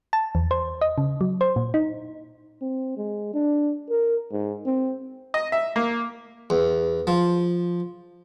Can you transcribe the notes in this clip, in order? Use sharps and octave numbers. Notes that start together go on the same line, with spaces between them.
A5
E2
C5
D#5
C#3
F#3
C5
A#2
D#4
C4
G#3
D4
A#4
G#2
C4
D#5
E5
A#3
E2
F3